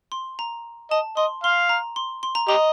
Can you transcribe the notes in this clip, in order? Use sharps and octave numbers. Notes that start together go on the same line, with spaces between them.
C6
A#5
D#5 A5
D#5 C6
F5 C6
A#5
C6
C6
A#5
G4 D#5 A#5